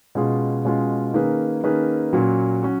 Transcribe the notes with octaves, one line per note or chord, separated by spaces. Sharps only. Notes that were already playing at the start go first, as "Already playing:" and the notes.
B2 G#3 C#4 F4 G#4
B2 G#3 C#4 F4 G#4
D#3 A#3 C#4 G#4 B4
D#3 A#3 C#4 G#4 B4
A#2 F#3 C#4 F#4
F#3 C#4 F#4